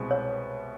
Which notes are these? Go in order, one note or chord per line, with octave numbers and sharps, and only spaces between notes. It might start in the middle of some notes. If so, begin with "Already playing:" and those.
Already playing: C2 B2 G#3 C4
C#5